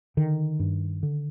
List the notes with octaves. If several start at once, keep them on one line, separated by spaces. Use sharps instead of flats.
D3 D#3
G2
D3